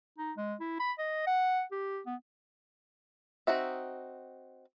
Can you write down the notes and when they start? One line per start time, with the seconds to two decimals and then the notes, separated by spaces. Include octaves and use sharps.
0.18 D#4
0.37 G#3
0.60 E4
0.80 B5
0.98 D#5
1.27 F#5
1.72 G4
2.06 B3
3.47 C4 D#4 F#4 E5